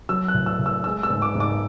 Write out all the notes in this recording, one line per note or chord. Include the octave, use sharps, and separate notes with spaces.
F#3 E6
F#6
A2
E6
A2
E6
G#3 E6
E6
G#2
D6
G#2
D6